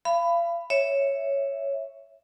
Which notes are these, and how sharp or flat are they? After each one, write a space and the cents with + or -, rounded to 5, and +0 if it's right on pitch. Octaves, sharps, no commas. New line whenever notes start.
F5 -35 B5 +15
C#5 +0 E5 +0